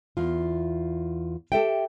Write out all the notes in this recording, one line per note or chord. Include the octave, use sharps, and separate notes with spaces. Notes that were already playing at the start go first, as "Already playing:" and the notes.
E2 F4
G4 A4 E5 G5